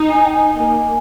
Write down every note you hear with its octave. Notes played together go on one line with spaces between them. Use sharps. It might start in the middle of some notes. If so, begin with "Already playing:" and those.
Already playing: D#4
G#5
G5
G#5
A#3 G#5